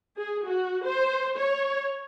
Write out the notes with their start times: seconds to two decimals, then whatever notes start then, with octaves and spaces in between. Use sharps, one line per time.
0.18 G#4
0.47 F#4
0.85 C5
1.38 C#5